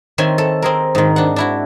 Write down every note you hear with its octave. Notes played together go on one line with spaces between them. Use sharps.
D#3 C4 C#5 E5 G#5
A4
C4 G#4 A#4
G#2 D#3
D4 F#5
D4 E4 F#4